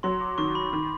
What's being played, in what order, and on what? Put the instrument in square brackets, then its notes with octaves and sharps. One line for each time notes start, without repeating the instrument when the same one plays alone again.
[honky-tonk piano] F#3 [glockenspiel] C6
[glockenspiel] D6
[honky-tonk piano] D#3 [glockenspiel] C#6
[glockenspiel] B5
[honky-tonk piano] D#3